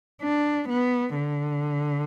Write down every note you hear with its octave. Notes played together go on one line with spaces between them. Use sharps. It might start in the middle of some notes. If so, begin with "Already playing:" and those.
D4
B3
D3